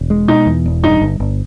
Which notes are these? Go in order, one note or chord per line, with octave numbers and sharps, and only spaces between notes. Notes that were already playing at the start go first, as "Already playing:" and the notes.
Already playing: E1
G#3
B2 D#4
E2
E1
G2 D#4
G1
G1